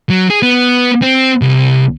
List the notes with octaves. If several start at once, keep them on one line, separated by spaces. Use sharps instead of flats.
F#3
G#4
B3
C4
C2